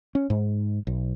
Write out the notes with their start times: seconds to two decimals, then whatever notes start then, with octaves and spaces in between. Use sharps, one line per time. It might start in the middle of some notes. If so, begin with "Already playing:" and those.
0.15 C#4
0.30 G#2
0.87 B1